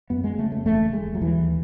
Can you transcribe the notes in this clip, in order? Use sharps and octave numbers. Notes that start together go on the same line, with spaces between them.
F#2 B3
G#3
C#3 A3
A3
E1 A3
E1 G#3
F#3
D#2 E3